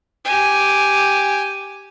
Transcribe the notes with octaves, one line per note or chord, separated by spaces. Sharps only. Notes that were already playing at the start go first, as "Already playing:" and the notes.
G4 G#5